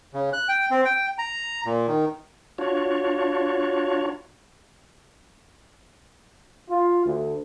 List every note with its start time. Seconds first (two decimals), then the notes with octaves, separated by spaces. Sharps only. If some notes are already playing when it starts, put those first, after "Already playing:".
0.13 C#3
0.33 F#6
0.49 G5
0.71 C4
0.85 G5
1.18 A#5
1.66 A#2
1.88 D#3
2.58 D4 F4 F#4 C#5
6.69 F4
7.06 D2